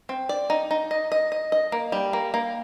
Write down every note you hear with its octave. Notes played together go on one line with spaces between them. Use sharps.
C4
D5
D#4
D#4
D#5
D#5
D#5
D#5
A#3
G3
A#3
A#3